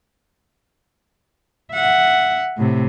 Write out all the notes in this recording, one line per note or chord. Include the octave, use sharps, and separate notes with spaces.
E5 F#5
A2 C3